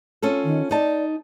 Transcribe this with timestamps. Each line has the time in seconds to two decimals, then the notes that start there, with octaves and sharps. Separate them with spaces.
0.22 C#4 F4 A4
0.45 D#3
0.71 D#4 D5 A5